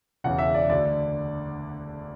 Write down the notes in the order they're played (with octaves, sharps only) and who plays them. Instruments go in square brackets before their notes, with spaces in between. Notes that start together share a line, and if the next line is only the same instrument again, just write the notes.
[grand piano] E1 E2 C#3 E3 F#5
E5
D5
D2 D3 D5